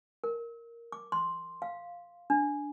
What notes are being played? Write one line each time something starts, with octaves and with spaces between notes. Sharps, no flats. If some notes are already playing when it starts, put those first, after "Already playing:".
A#4
D6
C6
F5
D4